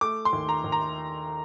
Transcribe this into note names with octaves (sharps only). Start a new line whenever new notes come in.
A3 D6
C6
D#2
A#5
D#2
A#5